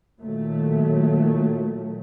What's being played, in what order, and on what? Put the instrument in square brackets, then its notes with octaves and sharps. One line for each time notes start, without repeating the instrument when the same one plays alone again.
[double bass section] A#2 D#3 F#3 A3